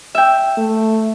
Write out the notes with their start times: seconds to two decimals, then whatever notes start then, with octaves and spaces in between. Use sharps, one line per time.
0.15 E5 G5
0.58 A3